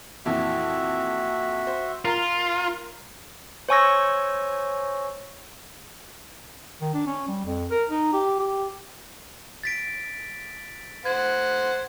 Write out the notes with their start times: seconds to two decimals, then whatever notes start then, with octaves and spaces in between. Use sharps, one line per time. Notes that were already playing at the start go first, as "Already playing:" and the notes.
0.26 F2 A#2 E3 F#4 E5
1.67 C5
2.05 F4 A#4 A#5
3.69 C5 C#5 G#5 C#6 E6 A#6
6.81 D#3
6.94 D4
7.06 C#4
7.28 G3
7.45 F2
7.70 A#4
7.90 D#4
8.13 G4
8.39 G4
9.63 A6 B6 D7
11.05 C5 F#5 G#6